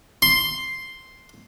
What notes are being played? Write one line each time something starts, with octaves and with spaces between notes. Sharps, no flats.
C6